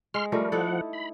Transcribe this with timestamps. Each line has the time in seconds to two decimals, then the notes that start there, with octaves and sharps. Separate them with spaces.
0.14 G#3 C6 F6
0.32 F3 G3 A3 A#4
0.52 F3 D#4 E4 A4 F#5
0.93 B5